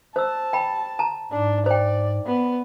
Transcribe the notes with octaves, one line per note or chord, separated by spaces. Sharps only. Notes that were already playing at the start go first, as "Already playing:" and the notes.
C5 A5 E6
G5 B5
A5 A#5
G#2 D4
C5 D5 G5
B3